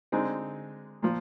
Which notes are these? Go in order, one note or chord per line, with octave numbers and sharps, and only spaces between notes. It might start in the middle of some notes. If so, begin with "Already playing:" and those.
D3 G#3 C4 D#4
A#2 F3